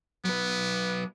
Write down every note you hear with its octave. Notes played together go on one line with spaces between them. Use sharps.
F#3 B3 B4